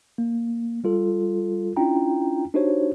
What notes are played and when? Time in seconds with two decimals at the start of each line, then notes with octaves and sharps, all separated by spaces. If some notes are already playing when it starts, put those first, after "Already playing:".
0.18 A#3
0.84 G3 F4 A4
1.76 C#4 D4 E4 F4 G5 A#5
2.54 D4 D#4 F#4 G4 C5 C#5